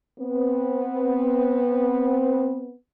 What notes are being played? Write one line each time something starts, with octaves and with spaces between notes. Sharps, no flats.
B3 C4